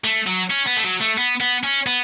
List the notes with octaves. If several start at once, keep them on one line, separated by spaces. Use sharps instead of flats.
A3
F#3
C#4
B3
A3
F#3
A3
B3
B3
C#4
B3